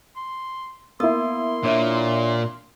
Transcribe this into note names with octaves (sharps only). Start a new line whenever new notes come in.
C6
A#3 B3 E4 C6 D#6
A#2 D4 C#5 E5